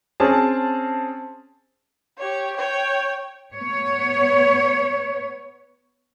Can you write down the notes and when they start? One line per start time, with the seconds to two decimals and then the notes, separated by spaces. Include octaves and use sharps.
0.20 C4 C#4 G#4 A5
2.18 G4 C#5
2.56 C#5 G5
3.54 B3 C#5